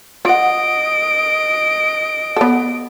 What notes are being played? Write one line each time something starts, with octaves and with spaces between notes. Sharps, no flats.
F4 D#5 F#5 D7
B3 A4